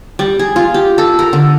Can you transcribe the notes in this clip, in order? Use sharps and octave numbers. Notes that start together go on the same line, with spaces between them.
G3
G#4
F4
G4
A4
A#4
D3